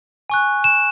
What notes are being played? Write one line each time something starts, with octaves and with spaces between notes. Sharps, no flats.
G#5 C#6 F#6
E7